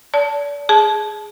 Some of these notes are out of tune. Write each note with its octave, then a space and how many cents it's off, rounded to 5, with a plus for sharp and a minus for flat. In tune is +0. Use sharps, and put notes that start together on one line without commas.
D5 -35 A5 +0
G#4 +0 A5 -25